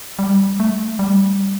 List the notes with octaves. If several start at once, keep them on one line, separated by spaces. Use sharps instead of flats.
G3
A3
G3